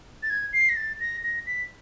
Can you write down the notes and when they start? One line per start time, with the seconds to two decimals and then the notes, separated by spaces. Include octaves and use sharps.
0.23 A6
0.30 G#6
0.53 C7
0.69 A#6
0.76 A6
1.00 A#6
1.23 A#6
1.47 B6